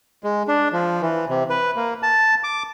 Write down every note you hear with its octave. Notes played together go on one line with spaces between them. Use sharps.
G#3
D4
F3
E3
C3
B4
A#3
A5
D6